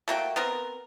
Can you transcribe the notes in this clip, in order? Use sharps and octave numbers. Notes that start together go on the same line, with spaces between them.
A3 A#3 F#4 G5
B3 C4 A#4